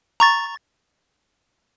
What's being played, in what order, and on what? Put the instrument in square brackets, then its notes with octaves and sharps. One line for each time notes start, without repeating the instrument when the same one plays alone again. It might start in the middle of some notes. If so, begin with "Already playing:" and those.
[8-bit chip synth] A#5 C#6 A6